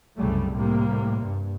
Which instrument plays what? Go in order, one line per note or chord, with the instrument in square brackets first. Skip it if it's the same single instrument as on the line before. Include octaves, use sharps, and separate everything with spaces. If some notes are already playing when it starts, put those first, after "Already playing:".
[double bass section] C2 F#2 C#3 G3 A3
A2 C3 G3 A#3
G2